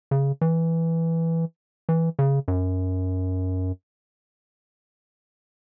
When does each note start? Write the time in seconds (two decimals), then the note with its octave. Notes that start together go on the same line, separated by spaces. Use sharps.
0.11 C#3
0.41 E3
1.89 E3
2.19 C#3
2.48 F#2